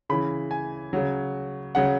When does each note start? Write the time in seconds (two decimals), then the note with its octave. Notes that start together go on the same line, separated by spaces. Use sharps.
0.09 C#3 E3 B5
0.51 G#5
0.93 C#3 F#3
1.75 C#3 F#3 F#5